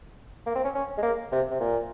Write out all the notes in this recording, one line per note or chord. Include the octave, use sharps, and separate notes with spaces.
A#3
C4
C#4
C#4
G#3
A#3
C3
C3
A#2